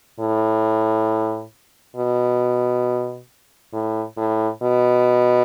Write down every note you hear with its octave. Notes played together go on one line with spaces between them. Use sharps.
A2
B2
A2
A2
B2